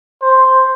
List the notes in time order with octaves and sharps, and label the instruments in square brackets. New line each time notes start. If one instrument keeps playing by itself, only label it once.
[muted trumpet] C5